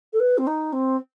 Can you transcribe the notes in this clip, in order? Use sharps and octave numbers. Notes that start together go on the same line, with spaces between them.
A4
B4
C4
D#4
C4